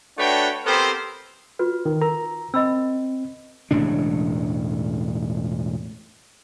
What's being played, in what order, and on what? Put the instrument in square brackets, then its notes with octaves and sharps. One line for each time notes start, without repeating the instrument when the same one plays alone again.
[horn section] A3 D4 F#4 B4 C#5 G5
B3 C4 G4 A4 A#4 C5
[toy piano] F4 F#4 B4
[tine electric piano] D#3
[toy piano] A#4 [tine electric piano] A#5
[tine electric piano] C4 [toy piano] D#5 B5 E6
[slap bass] E1 A2 C#3 D4